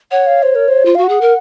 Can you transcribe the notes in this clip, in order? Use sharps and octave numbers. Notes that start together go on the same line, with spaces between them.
C#5 F#5
F5
C5
A#4
C5
F4
F#4 F5
F#5
G#4
A#4